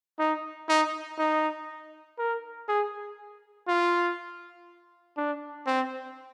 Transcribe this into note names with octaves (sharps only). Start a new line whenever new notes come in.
D#4
D#4
D#4
A#4
G#4
F4
D4
C4